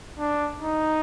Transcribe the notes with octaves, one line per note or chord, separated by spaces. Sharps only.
D4
D#4